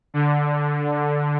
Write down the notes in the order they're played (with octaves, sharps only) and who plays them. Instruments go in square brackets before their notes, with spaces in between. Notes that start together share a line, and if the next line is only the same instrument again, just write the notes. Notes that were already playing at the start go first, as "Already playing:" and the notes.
[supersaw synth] D3